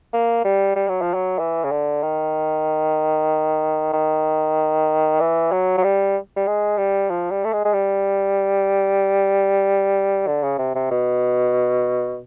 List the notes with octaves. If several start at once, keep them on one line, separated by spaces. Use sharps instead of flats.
A#3
G3
G3
F#3
F3
F#3
E3
C#3
D3
D#3
D#3
E3
F#3
F#3
G3
G3
G#3
G3
F3
G3
A3
G#3
G#3
G3
D3
C#3
C3
C3
B2